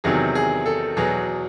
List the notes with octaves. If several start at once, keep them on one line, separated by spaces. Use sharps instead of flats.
E2 C3 D#3 F#3 G#4
G#4
A4
E2 B2 F#3 G#4